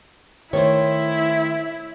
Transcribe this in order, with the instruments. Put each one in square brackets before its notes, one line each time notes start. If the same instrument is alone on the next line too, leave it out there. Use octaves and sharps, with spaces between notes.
[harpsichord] D#3 A3 C5 [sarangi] E4 [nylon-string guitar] C#5